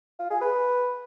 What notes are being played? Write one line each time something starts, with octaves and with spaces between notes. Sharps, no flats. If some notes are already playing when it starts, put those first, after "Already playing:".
F4
G#4
B4